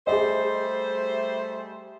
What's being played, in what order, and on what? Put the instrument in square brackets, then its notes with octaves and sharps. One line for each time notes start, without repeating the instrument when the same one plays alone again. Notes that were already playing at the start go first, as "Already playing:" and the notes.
[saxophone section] G3 A3 C5 [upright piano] G#4 D#5